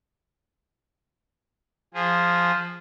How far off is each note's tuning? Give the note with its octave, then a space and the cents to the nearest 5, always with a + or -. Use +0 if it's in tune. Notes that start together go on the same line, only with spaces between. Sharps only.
F3 +0 G#4 -25